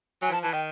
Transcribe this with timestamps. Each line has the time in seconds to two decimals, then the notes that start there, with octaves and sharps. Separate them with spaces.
0.22 F#3 G#5
0.29 E3
0.32 F3 A5
0.43 E3 A5
0.53 D#3 G5